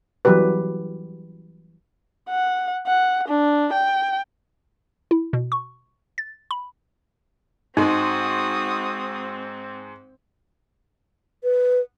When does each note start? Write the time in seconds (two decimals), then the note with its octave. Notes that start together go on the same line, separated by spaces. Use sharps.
0.25 E3 F#3 G3 G4 B4
2.30 F#5
2.87 F#5
3.28 D4
3.73 G5
5.11 E4
5.33 B2
5.52 C#6
6.18 A6
6.51 B5
7.77 G#2 G#3 C4 D#4 F#4 D#6
11.44 B4